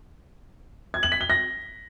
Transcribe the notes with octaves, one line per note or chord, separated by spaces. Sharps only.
G#6
F#7
B6
G7
A#6